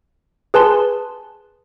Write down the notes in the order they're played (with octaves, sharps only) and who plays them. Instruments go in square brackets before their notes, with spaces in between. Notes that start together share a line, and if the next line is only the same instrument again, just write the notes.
[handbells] G#4 B4 G#5 A5 C6